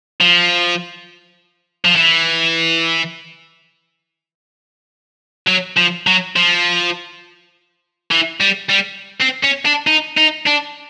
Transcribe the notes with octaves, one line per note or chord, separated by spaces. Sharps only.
F3
F3
E3
F#3
F3
F#3
F3
E3
G3
G3
C4
C#4
D4
D#4
D#4
D4